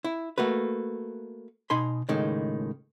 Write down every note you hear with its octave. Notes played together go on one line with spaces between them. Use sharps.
E4
A3 A#3 F#4 B4
B2 D#4 G#5 B5 C6
C#2 A2 D#3 G#3